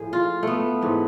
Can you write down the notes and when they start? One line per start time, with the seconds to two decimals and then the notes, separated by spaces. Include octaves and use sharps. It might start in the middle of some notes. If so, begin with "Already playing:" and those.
Already playing: A2 F3 G#4
0.13 F4
0.43 A3 B3
0.82 G#2 E3